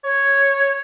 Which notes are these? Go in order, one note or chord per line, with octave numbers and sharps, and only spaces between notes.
C#5